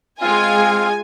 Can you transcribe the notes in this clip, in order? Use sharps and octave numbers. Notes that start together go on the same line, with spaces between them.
G#3 C4 F4 F5 G#5